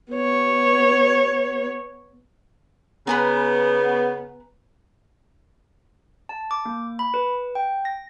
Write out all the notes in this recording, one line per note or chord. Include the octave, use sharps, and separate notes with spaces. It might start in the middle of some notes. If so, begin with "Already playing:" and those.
B3 C#5
C#3 B3 B4 G#5 A#5
A5
D6
A#3
B5
B4
G5
A#6